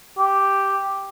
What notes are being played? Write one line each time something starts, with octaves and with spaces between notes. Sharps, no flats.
G4